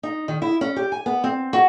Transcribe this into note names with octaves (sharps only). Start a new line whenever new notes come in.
D#4
D#3
E4
C#4
G4
G#5
B3
C4
F#4